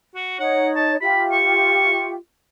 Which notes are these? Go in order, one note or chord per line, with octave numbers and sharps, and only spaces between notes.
F#4
D#4 C#5 F#5
A5
F4 G4 E5 B5
C#6